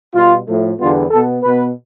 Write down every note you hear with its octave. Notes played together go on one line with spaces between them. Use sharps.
B2 G3 B3 F4
A2 F3 A3
E2 D3 G3 B3 F4
B2 B3 A4
B2 B3 B4